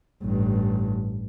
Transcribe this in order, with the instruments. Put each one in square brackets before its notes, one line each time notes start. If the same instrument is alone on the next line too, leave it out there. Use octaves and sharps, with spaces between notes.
[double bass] A1 G2